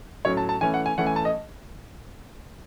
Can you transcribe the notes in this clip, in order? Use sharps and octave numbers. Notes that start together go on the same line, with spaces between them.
A2 F#3 C#4 C#5
A5
A5
E3 A3 C#4 G#5
F#5
G#5
E3 A3 C#4 F#5
G#5
A5
D#5